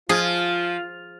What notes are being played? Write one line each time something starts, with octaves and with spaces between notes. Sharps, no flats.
F3 F4 G#4